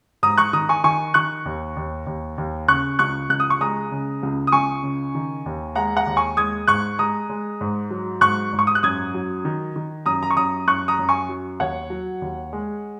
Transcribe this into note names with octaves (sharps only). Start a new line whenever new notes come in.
G#2 A#5 D#6
C#6 F#6
D#3 A#5 D#6
G#5 C#6
D#3 G#5 C#6
D#3 C#6 F#6
D#2
D#2
D#2
D#2
C#3 C#6 F#6
C#2 C#6 F#6
C#2 F#6
D#6
C#6
G#3 A#5 D#6
C#3
C#2
D#6
C#2 G#5 C#6
C#3
D#3
D#2
G#3 F#5 A#5
F#5 A#5
D#2
G#5 C#6
G#3 D#6 G#6
G#2 C#6 F#6
G#3 A#5 D#6
G#3
G#2
F#3
G#2 C#6 F#6
G#2
C#6
D#6
F#6
F#2 D#6 G#6
F#3
D#3
D#3
F#2 A#5 D#6
A#5
C#6
F#2 A#5 D#6
F#2 C#6 F#6
A#5 D#6
F#2
G#5 C#6
F#3
D#2 C#5 F#5
F#3
D#2
G#3